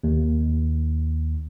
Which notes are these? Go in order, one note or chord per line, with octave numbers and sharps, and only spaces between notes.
D#2